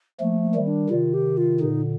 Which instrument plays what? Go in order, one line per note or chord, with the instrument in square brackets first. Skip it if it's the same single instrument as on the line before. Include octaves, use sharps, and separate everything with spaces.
[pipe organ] F3 A3 [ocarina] A#3
[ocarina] A#3
[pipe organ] D#3 G3
[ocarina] D4
[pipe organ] C3 D#3 [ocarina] F4
[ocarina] G4
F4
[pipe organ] A#2 D3 [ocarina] D#4